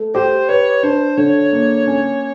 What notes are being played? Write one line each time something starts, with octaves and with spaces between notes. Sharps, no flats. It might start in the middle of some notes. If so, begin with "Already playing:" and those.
Already playing: A3
G4 C5
B4 C#5
D4 C5
D3 C#5
A#3
C#4